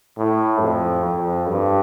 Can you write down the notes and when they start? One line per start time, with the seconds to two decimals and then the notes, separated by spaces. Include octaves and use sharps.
0.17 A2
0.61 F2
1.05 F2
1.49 G2